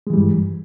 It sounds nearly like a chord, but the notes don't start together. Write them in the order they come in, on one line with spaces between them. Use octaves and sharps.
G#3 E3 G3 G2